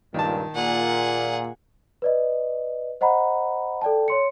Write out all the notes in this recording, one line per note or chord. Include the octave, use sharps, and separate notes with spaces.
C#2 G2 A#2 D#3 A5
A#2 G#4 F#5
B4 D5 D#5
C5 D#5 F#5 A#5 B5
A4 D5 G5 A5
C#5 C6 C#7